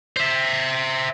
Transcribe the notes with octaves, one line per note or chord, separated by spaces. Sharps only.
C5 E5